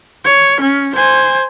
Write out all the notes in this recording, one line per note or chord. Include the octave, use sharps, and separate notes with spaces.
C#5
C#4
C5 G#5